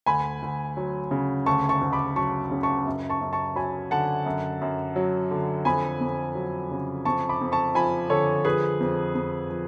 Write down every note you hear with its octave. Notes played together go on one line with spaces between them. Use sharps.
D2 G#5 B5
D2
F#3
C#3
D2 A5 C#6
A5 C#6
D2
B5 D6
F#3 A5 C#6
C#3
A5 C#6
F#2
A5 C#6
F#2
A5 C#6
F#3 G#5 B5
D3 F#5 A5
F#2
F#2
F#3
D3
F2 G#5 B5
F2
F#3
C#3
F2 A5 C#6
B5 D6
F2
A5 C#6
F3 G#5 B5
D3 A4 C#5
F3 G#4 B4
F2
F2
F3